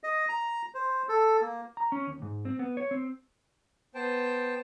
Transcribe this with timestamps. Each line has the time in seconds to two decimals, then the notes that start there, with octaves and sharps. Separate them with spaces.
0.03 D#5
0.29 A#5
0.74 C5
1.09 A4
1.41 A#3
1.77 A#5
1.92 C#4
2.07 D#2
2.22 G#2
2.45 C4
2.59 B3
2.77 C#5
2.91 C4
3.95 B3 C5 G5 A5